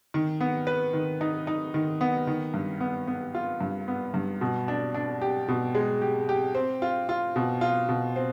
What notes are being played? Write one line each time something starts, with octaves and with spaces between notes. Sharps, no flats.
D#3
B3
B4
D#3
D#4
D#4
D#3
B3
D#3
G2
B3
B3
F4
G2
B3
G2
B2
D4
D4
G4
B2
G#3
G4
G4
C4
F4
F4
B2
F4
B2
C4